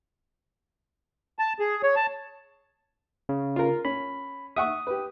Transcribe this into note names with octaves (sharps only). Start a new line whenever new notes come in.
A5
G#4
C#5
A5
C#3
F4 A#4
C#4 B5
E5 F#5 C#6 D#6
G4 B4